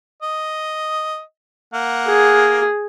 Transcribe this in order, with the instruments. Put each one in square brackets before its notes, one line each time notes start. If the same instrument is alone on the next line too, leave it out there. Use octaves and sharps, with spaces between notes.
[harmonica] D#5
A#3 F#5
[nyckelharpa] G#4